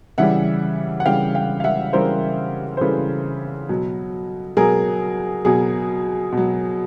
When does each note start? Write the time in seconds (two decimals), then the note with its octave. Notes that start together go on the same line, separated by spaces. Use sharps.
0.18 C#3 E3 G3 E5 F#5
1.00 F#5
1.06 C#3 E3 G3 F5 G5
1.35 F5 G5
1.60 F5
1.64 E5 F#5
1.93 C#3 E3 G3 A#4 C5
2.77 C5
2.81 C#3 E3 G3 A4 B4
3.69 B2 F#3
4.57 B2 F#3 G#4 A#4
5.45 B2 F#3 G#4
6.32 B2 F#3